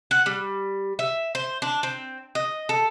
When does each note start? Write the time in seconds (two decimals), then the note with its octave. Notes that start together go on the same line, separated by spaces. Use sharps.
0.11 F#5
0.26 G3
0.99 E5
1.35 C5
1.62 D4
1.83 C4
2.35 D#5
2.69 A4